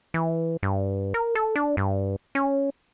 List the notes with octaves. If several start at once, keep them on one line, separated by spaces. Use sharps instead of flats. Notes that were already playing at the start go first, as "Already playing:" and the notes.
E3
G2
A#4
A4
D4
G2
C#4